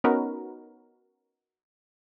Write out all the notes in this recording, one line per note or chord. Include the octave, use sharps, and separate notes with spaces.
B3 C#4 D#4 F#4 A#4 B4